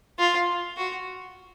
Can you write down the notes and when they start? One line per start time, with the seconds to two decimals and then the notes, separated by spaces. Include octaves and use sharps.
0.19 F4
0.77 F#4